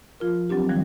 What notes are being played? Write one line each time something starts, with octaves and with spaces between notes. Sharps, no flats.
F3 F4 A#4
F#3 C4 D4 G4
D#3 F3 G3